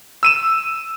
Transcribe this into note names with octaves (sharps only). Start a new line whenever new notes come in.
E6 D#7 E7